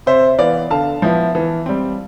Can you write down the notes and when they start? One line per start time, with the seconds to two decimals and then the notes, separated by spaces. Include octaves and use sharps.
0.06 C3 C5 E5
0.39 E3 B3 D5 F5
0.70 D3 F5 A5
1.02 F3 B3 E4
1.35 E3
1.66 G3 C4